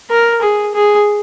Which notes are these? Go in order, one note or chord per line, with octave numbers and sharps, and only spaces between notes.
A#4
G#4
G#4